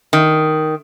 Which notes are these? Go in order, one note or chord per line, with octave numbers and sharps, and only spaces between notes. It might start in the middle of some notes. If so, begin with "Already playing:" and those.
D#3